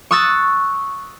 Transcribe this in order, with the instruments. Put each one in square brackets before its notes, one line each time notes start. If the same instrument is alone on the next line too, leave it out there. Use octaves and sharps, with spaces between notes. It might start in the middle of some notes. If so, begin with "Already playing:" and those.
[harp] C#6 D#6 E6 F#6 A6